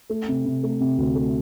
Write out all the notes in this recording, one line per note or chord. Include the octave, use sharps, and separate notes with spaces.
A3
C3
C3
A3
C3
D2
A3